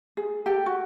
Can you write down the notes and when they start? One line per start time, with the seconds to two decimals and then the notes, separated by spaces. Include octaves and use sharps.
0.17 G#4
0.46 G4 A4 G5
0.66 F#4